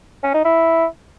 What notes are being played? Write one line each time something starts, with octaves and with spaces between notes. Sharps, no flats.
C#4
D#4
E4